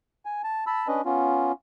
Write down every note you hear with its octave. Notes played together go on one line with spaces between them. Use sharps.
G#5
A5
A5 B5 E6
C#4 D4 B4 D#5
B3 C#4 F4